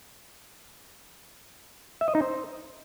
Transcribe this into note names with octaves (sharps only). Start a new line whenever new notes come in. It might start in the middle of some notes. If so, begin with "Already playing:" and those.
E5
D#5
D#4
C5